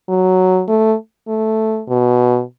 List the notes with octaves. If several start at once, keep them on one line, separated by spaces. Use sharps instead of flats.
F#3
A3
A3
B2